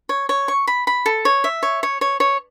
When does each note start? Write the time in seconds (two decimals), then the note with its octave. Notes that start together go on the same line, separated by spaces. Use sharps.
0.09 C#5
0.29 C#5
0.48 C#6
0.67 B5
0.87 B5
1.06 A4
1.25 C#5
1.44 E5
1.63 C#5
1.83 C#5
2.01 C#5
2.20 C#5